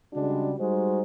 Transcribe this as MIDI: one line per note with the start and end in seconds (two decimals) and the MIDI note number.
0.13 0.53 49
0.13 0.53 55
0.13 0.53 56
0.13 0.53 62
0.13 0.53 66
0.59 1.01 55
0.59 1.01 56
0.59 1.01 63
0.59 1.01 66
0.59 1.01 72